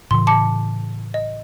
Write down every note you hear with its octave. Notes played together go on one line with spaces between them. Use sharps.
A2 C#3 E3 C6
A5 D6 C#7
D#5